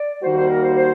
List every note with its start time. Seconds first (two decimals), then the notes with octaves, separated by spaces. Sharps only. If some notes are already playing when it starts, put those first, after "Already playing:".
Already playing: D5
0.22 D#2 D#3 G3 A#3 F#4 C5
0.36 C5
0.49 A#4
0.62 C5
0.76 C5